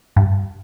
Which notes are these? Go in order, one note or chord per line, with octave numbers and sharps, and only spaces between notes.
G2